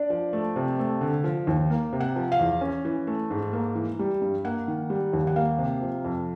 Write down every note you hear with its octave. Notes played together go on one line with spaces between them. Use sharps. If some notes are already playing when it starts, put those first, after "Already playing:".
Already playing: D4 D5
F3
A3
C3
A3
D3
F3
D#2
A#3
C3
F#5
F3
F5
E2
C#4
E3
A3
G#2
A#3
E3
G3
G2
A#3 F#5
D#3
G3
D#2
F#5
A#3 F5
C3
F3
F2